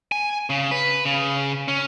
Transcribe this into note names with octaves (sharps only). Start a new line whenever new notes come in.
G#5
C#3
B4
C#3
C#4